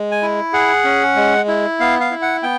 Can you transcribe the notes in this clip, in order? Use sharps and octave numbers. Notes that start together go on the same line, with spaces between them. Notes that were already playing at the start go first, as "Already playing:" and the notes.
Already playing: G#3
G#5
E4
G#4 F#5
C#4
G#3
E4
B3 F5
F5
E4
F#5
B3 G5